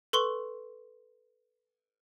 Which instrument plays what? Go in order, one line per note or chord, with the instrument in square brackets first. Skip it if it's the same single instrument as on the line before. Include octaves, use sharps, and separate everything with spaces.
[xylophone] A4 B4 C6 C#6 G7